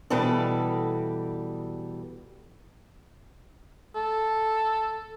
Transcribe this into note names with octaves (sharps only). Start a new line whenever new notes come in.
B2 E3 G3 A4 D5
A4